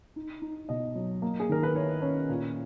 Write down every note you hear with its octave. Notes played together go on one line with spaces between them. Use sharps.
D#4
D#4
B2 D#5
F#3
A#3
G#4
D#3 A#4
B4
E4 C#5
C#4
A#2